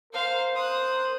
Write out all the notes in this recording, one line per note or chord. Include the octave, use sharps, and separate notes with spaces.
A#4 C5 F5
C5 D#6 F#6